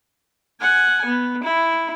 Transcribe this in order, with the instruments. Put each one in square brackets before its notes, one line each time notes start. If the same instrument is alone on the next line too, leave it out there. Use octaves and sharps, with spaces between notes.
[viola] F#5 G#5
B3
E4